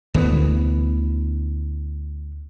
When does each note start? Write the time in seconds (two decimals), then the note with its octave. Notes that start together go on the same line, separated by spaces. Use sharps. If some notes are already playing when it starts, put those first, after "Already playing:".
0.14 D2 E3 G3 B3